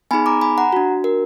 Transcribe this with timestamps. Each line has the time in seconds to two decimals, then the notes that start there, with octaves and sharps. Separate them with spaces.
0.11 B3 D#4 G#4 G#5 B5
0.26 A#5 D6
0.41 G#5 B5
0.58 F#5 A#5
0.73 D4 F#4
1.04 A#4